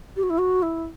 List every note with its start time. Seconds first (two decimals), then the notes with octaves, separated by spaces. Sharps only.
0.16 G4
0.23 F#4
0.30 E4
0.38 F#4
0.62 E4